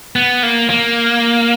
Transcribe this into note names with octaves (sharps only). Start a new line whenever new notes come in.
B3
A#3
A#3